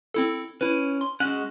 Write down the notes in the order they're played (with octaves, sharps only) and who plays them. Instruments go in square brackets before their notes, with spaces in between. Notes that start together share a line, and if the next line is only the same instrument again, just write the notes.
[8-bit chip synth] C4 E4 A4
[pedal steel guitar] C#4 [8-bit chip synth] E4 B4
[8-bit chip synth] C6
[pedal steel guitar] G#3 F#4 F#5 [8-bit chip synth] C#4